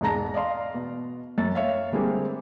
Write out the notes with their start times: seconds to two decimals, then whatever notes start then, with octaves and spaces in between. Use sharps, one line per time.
0.01 E1 G#2 G#3 A5 A#5 A#6
0.34 D5 D#5 F5 C6
0.74 B2
1.38 F#2 A6
1.55 C#5 E5 F5
1.92 D3 G3 G#3 A#3 C4